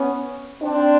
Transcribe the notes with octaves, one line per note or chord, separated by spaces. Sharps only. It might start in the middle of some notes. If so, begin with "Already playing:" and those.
Already playing: B3 C#4
C4 D4